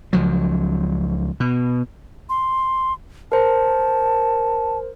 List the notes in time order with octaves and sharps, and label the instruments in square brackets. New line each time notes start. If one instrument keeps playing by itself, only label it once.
[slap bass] C#2 F3 F#3
B2
[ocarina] C6
[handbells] A#4 C5 [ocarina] A5